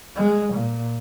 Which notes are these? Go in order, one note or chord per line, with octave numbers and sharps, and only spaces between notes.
G#3
A#2